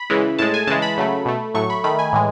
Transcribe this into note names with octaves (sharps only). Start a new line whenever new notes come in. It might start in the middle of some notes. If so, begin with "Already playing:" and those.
Already playing: B5
C#3 E3 G#3
A2 G#3 A5
G#5
C#3 E3 G#3 A5
B5
C#3 F#3 A3
B2 A3
A2 F#3 A3 C#6
B5
D#3 A3 B5
G#5
A2 E3 G#3